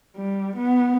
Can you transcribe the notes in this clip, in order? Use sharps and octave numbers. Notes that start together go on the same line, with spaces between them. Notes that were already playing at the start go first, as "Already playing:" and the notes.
G3
B3